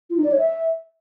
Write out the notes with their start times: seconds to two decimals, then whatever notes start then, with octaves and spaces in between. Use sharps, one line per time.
0.10 F4
0.17 D#4
0.24 D5
0.31 C#5
0.38 E5